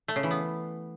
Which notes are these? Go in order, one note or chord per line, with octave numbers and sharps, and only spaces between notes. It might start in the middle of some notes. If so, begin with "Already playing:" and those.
A3
C#3
E3
B3